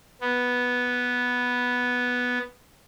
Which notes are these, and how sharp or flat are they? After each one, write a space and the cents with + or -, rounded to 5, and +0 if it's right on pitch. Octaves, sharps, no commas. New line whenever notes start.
B3 -5